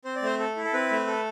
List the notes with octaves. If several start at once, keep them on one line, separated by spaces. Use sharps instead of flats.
C4 C5
D5
A3 C5
A4
E4
A4
C4 B4
A3
A4